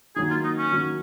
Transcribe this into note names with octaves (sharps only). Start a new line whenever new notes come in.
D#3 F#3 A#3 G#4
F4
D#4
C#4
D#3 F#3 A#3